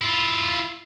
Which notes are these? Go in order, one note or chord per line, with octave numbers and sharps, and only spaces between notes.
E4 F4